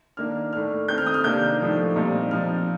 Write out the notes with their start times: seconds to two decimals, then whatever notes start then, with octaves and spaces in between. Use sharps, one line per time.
0.17 D#3 A#3 D4 F6
0.53 A2 A3 D4 F6
0.88 D#3 A3 C4 G6
0.98 F6
1.06 D#6
1.14 F6
1.24 C3 D#3 A#3 D4 G6
1.60 A2 F3 A3 D4
1.96 A#2 G3 C4 D#4
2.31 A#2 F3 C4 D#4 F6